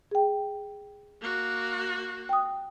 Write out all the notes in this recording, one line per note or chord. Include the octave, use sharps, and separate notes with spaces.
G#4 G5
A#3 F#4
G5 D#6